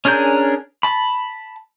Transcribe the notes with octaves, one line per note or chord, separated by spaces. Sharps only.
C#4 D4 G#4 A#4 G6
A5 B5